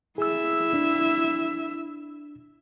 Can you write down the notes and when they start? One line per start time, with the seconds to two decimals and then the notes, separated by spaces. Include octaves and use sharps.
0.18 E4 G#4 E5 E6
0.74 D4